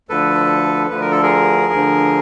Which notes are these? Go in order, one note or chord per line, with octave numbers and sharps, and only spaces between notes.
D2 D3 F3 A4 B4
D2 D3 F3 B4
A#4
A4
G#4 A#4
D2 D3 F3